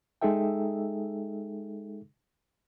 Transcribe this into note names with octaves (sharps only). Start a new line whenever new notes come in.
G#3 D#4 G#4 A4 E5 G5